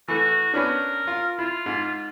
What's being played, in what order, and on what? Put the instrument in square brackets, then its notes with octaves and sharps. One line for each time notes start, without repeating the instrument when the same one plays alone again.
[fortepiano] E3 A3 [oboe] F#4
[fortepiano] B3 C#4 D4 [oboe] A#4
[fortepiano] F4
[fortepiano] E4 [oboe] F4
[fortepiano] G#2